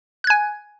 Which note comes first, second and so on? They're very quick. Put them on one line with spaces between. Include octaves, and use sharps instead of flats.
F#6 G#6 G#5